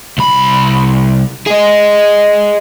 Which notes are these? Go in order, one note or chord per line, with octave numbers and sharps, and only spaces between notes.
C2 B5
G#4 D#5